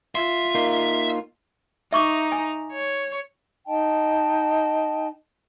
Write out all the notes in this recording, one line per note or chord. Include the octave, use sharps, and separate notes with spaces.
F4 E5 C6
A#3 D#4 C6
D#4 E5 A#5 C#6 D6
G#5
C#5
D#4 D#5 G5 A5